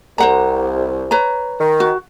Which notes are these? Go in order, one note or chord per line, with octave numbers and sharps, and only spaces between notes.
C2 C5 F#5 A#5
B4 C#5 A#5
D#3
F#4